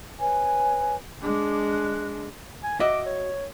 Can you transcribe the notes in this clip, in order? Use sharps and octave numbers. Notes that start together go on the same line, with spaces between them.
B4 C#5 G#5
G#3 D4 D6
F#6
G#5
F#4 D#5 E5 D6
C#5